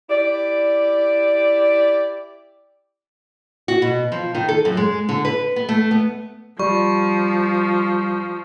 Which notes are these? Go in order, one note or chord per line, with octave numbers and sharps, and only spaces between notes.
E4 G4 D5
F#4
B2
F3
D#3
A4
F#2
G#3
D3
B4
B3
A3
B3
F3 G3 C#6